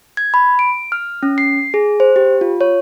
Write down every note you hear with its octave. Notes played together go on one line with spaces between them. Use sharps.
G#6
B5
D7
F6
C#4
C7
G#4
C5
G4
F4
C#5